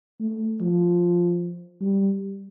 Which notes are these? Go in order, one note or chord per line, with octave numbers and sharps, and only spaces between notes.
A3
F3
G3